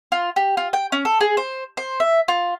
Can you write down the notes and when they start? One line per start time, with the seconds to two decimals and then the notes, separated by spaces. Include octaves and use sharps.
0.12 F4
0.36 G4
0.57 F4
0.73 G5
0.92 C#4
1.05 A4
1.21 G#4
1.37 C5
1.77 C5
2.00 E5
2.28 F4